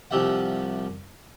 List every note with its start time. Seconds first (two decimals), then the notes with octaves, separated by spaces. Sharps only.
0.11 C2 F3 G4 E5 F#5